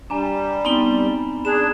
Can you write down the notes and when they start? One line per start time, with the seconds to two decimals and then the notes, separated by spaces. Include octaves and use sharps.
0.10 G3 D4 G#5 A#5 E7
0.65 B3 C4 D#4 B5 G7
1.45 D4 G#4 B5 E7